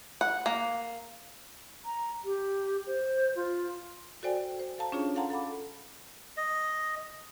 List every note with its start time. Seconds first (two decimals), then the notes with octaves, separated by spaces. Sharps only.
0.21 F#5
0.46 A#3
1.85 A#5
2.25 G4
2.87 C5
3.36 F4
4.23 F#4 A4 C5 D5 G5 G#5
4.59 C5 G5
4.78 A4 F5 A5 A#5
4.92 C#4 D4 F4 G#4 C#5
5.16 A4 F5 F#5 A5 A#5 C6
5.30 A4 F#5 B5 D6
6.37 D#5